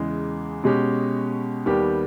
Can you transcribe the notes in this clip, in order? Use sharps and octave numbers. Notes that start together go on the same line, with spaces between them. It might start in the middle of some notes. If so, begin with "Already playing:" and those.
Already playing: E2 C#3 E3 G#3
B2 G#3 C#4 G4
D#2 D#3 G3 B3 G4